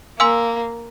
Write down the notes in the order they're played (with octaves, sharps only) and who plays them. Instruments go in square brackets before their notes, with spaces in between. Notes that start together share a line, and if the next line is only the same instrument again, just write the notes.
[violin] A#3 [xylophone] F5 G#5 C6 E6